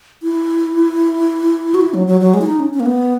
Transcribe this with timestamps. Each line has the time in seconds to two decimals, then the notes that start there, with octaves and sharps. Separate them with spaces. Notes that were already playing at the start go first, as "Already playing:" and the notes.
0.23 E4
1.74 F#4
1.81 E4
1.94 F#3
2.07 F#3
2.21 F#3
2.34 G#3
2.41 E4
2.47 D#4
2.60 C#4
2.74 C#4
2.80 A#3
2.86 B3